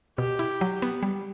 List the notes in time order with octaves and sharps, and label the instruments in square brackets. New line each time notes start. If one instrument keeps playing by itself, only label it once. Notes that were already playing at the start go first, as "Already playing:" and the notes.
[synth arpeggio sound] B2 [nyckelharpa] G4
[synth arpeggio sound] E4
F#3
B3
G3